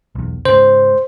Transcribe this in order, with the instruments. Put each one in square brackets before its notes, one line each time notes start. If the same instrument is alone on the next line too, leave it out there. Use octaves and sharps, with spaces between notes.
[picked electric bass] B1 E2
[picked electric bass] G#2 C#3 [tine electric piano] C5